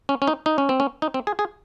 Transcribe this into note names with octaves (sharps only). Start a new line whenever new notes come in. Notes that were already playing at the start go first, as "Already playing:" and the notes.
C#4
C#4
D#4
D#4
C#4
C4
C#4
D#4
C4
G#4
G#4